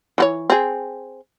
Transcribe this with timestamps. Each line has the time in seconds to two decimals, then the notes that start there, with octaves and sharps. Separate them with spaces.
0.18 E3 F#4 C#5
0.50 C4 G#4